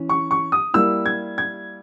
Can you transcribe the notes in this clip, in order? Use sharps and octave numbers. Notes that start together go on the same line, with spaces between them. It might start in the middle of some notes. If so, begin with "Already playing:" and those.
Already playing: E3 C#4
C#6
C#6
D#6
G3 A#3 E4 E6
G#6
G#6